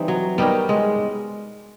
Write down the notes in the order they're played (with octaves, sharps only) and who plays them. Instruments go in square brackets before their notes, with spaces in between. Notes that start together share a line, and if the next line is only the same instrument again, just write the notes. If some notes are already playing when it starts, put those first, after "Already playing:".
Already playing: [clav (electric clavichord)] E3 G3 C4 D#4
[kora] F#3
[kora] G3 [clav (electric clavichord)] B3 D#4 G4 A#4 C#5
[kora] G#3